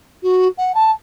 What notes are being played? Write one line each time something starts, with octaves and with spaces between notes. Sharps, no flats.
F#4
F#5
A5